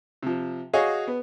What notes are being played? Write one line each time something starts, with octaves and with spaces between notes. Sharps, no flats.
C3 F3
F#4 G#4 C#5 D#5 F5
B3